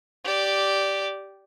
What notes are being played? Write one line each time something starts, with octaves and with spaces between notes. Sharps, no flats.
G4 D5